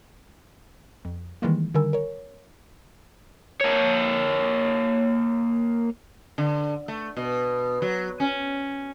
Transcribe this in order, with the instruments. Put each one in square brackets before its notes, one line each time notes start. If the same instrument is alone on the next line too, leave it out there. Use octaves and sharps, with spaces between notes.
[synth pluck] F2
D#3 E3 G3 G#3 A#3
D3 D#3 G3 A#4 G#5 E6
A#4 C#5
[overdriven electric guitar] A#3 C#5
[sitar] D3
A3
B2
F#3
C#4